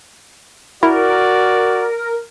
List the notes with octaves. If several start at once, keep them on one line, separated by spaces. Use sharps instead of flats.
E4 F#4 A#4 D5